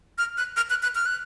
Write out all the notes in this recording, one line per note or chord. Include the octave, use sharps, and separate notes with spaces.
F6
F#6
F6
F#6
F#6
F6
F#6